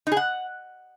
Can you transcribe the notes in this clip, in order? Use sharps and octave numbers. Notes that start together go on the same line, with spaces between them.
D#4
G#4
F#5